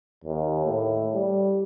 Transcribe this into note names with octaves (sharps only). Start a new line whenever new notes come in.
D#2
A2
G3